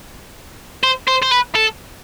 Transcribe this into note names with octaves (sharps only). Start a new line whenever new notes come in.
C5
C5
C5
B4
A4